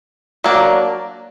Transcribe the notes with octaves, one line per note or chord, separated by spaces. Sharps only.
F#3 A#3 D4